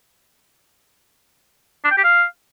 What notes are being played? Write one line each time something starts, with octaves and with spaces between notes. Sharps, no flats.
D4
G5
G4
F5